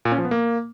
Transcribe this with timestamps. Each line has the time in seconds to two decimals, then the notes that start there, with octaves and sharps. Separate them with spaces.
0.05 A#2
0.12 C#4
0.18 F3
0.25 B3
0.31 A#3